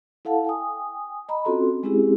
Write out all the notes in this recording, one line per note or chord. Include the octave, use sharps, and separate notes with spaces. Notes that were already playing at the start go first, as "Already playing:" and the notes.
E4 A4 F5 F#5 A5
G5 G#5 D#6
D#5 A#5 B5
C4 C#4 F4 F#4 A4 C6
G#3 C4 C#4 E4 G4 G#4